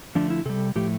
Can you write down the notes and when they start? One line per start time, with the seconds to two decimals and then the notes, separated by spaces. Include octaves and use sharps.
0.15 D3 F3 A3 D4
0.30 E4
0.45 C3 G3 A4
0.76 A2 F3 A3 G4